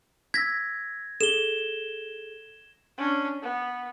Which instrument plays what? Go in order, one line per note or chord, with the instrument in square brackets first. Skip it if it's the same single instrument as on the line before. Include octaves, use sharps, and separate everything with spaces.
[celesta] E6 B6 [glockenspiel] G#6 A#6
[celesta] G#4 A4 [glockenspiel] E7 G7
[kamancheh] C#4 D4
B3